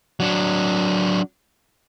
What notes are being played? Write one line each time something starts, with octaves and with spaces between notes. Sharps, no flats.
F#3 D4